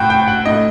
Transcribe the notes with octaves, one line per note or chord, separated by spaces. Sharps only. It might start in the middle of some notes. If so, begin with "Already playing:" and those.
Already playing: A2 F#4 G5
G5
F#5
A2 D#5